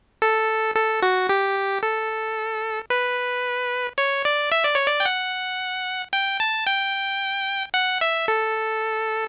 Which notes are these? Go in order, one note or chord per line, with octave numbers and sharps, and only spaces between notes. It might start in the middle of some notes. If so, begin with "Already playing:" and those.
A4
A4
F#4
G4
A4
B4
C#5
D5
E5
D5
C#5
D5
G5
F#5
G5
A5
G5
F#5
E5
A4